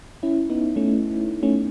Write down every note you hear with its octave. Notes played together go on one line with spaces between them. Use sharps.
C#4 E4
B3 D#4
A3 C#4
A3 C#4